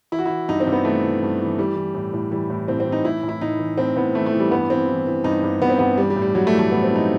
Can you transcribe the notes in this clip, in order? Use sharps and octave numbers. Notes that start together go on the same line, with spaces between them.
E3 E4
F#4
E3 E4
G2 D#4
C4
G2
B3
E3 A3
E3
G2
E3
E3 G3
E3
A2
A2
E3 G3
A2
A2 C4
C4
E3
D#4
A2 E4
A2
E4
A2 D#4
E3
A2 C4
A2 B3
E3 A3
A3
E3
G3
G2 B3
E3 C4
E3
E3
G2 D#4
G2
G2 B3
C4
G2 B3
E3 G3
G3
A2
G3
A2 F#3
A3
E3
A3
A2 B3
C4
E3
D#4